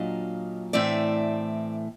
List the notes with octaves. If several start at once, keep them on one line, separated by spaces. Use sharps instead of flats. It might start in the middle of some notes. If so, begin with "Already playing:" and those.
Already playing: A#2 F#3 D4 D#5 F5
A2 E3 A3 C4 D5 E5